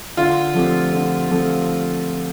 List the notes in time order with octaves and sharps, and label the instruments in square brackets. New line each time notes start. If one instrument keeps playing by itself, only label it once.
[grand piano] D3 [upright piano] F4
[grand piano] F3 A3 C4 G4
D3
F3 A3 C4 G4